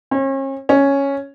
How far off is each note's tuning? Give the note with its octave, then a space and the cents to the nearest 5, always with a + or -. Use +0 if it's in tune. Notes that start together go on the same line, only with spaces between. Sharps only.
C#4 -40
C#4 +0